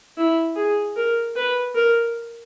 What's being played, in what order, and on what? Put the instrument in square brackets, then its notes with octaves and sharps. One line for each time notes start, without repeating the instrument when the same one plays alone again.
[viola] E4
G#4
A#4
B4
A#4